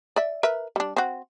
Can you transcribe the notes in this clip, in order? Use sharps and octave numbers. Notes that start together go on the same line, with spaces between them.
D5 E5
A#4 B4 E5
G3 D4
C4 F#4